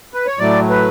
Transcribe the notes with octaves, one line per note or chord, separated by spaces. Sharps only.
B4
C#5
A2 F#3 A3 D5
B4